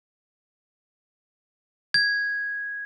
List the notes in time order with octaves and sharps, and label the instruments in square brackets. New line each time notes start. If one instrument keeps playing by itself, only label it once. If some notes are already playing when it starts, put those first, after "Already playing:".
[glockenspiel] G#6